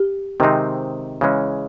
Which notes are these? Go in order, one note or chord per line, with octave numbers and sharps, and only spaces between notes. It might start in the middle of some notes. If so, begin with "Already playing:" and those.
Already playing: G4
C3 D#3 G#3 C4 D#4
C#3 E3 G#3 C#4